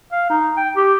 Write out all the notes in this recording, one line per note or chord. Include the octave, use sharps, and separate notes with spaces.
F5
D#4
G5
G4